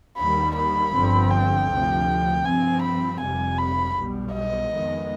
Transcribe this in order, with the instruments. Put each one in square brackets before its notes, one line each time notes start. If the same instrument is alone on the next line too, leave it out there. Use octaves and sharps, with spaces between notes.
[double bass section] D#2 D#3 G3 [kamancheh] B5
[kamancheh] B5
[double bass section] G1 G2 D3 F3 C4
[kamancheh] G5
[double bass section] D2 C3 F3
[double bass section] G2 F3 C4 [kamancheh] G#5
[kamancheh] B5
[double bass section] F1 F2 C3 G3 [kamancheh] G#5
[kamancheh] B5
[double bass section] B1 B2 G3 B3
[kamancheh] D#5
[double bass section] F2 D#3 G#3 B3